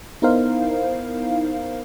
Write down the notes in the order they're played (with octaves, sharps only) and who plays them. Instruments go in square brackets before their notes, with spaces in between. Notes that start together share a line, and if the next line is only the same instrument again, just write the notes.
[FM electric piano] B3 D#4 E4 A#4 C5 F5